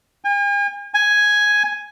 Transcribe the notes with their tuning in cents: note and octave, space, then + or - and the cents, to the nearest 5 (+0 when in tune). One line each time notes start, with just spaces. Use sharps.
G#5 -45
G#5 +5